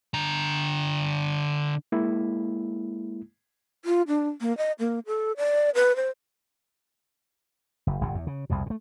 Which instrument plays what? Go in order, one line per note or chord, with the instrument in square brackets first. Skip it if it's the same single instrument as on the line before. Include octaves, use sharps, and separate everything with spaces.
[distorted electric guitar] D3 A#5
[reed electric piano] G#3 A#3 E4
[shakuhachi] F4
D4
A#3
D#5
A#3
A4
D5
B4
C5
[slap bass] F#1
G1 D#2 A#2
E2
C#3
C2 F2 B2
A#2 A3